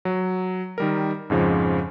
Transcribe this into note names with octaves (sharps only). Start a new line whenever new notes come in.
F#3
D#3 G3 A#4
F2 G#2 C#3 F3